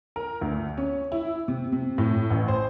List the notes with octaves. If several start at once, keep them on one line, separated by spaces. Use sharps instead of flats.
A#4
D2
C#4
E4
C3
C3
A2
A1
C5